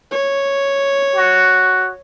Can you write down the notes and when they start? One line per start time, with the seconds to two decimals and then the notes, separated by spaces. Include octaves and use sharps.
0.11 C#5
1.15 F#4